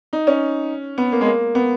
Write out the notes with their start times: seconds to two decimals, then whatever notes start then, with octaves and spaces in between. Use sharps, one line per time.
0.13 D#4
0.27 C#4
0.98 B3
1.12 A#3
1.21 G#3
1.26 A#3
1.55 B3